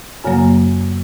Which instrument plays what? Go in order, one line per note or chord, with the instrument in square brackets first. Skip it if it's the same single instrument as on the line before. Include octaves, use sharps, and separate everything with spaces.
[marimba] F#2 C#3 F#3 A#3 G#5